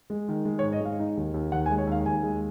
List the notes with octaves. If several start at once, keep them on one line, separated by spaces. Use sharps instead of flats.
G#3
D#3
G#3
C#5
G#2
D#5
G#3 F5
D#4
D#2
D#2
D#2 F#5
G#5
G#3
C#5
D#2 F5
D#2 G#5
G#3